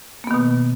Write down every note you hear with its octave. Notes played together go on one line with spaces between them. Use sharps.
B2 D#3 A#3 B3